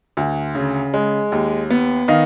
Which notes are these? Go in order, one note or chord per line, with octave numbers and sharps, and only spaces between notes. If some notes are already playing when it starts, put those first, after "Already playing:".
D2
C#3
G#3
D#2
B3
D#3 D#5 F5